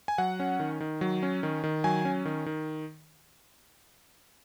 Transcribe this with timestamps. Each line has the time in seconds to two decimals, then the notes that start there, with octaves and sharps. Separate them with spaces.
0.08 G#5
0.18 F#3 F#5
0.40 C#4
0.60 D#3
0.80 D#3
1.01 F#3
1.23 C#4
1.43 D#3
1.64 D#3
1.84 F#3 G#5
2.05 C#4
2.25 D#3
2.46 D#3